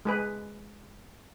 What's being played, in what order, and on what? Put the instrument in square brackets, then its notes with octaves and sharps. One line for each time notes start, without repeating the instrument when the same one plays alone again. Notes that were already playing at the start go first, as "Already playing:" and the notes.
[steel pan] G#3 G#4 B4